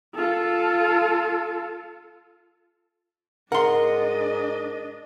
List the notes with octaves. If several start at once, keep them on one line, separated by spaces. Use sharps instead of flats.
F4 A4
G#2 D4 A#4 D#5 F#5 C6